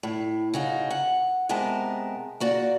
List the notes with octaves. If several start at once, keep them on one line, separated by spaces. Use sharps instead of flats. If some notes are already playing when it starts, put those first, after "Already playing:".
A2
C#3 D#4 F#4
F#5
C3 G#3 B3 A#4 A5
A#3 F#4 D5